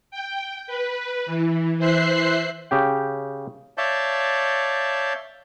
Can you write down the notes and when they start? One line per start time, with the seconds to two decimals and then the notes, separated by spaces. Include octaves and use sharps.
0.11 G5
0.67 B4
1.26 E3
1.78 E3 C5 E5 F#6 C7
2.71 C#3 G4 G5
3.78 C#5 D5 E5 F5 A5 G6